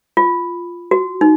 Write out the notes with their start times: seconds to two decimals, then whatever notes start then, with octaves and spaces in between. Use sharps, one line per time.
0.17 F4
0.91 F#4
1.21 D#4